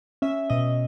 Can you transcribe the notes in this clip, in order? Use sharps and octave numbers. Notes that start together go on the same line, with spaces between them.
C#4 E5
B2 D#5